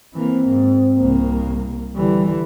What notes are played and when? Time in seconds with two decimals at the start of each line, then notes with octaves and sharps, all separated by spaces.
0.15 E3 A#3 C4
0.49 G#2
0.98 C2 A#3
1.96 D3 E3 G3